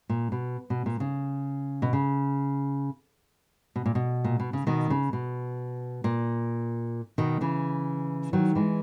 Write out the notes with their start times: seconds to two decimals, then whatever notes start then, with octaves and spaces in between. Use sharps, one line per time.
0.09 A#2
0.32 B2
0.70 B2
0.86 A#2
1.00 C#3
1.82 B2
1.93 C#3
3.76 B2
3.86 A#2
3.95 B2
4.24 A#2
4.40 B2
4.53 C#3
4.67 B2 D#3
4.90 C#3
5.13 B2
6.04 A#2
7.18 B2 D#3
7.41 C#3 E3
8.33 D#3 F#3
8.55 E3 G#3